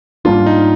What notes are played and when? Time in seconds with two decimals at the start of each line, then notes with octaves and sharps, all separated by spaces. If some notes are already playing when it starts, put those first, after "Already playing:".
0.25 G#2 G3 A#3 D4 F4
0.46 D#4